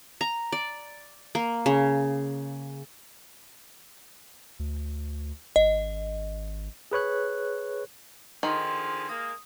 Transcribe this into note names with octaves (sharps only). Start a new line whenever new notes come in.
A#5
D5
A#3
C#3
D2
G#1 D#5
G#4 B4 C#5 F#6
D3 D#3 F3 G#4 C6
G#3 A#3 D#6